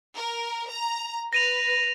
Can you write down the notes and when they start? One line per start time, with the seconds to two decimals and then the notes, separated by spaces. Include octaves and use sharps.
0.15 A#4
0.69 A#5
1.33 B4 A#6 D#7 F7